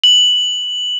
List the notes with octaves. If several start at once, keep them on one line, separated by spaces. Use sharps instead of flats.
F#7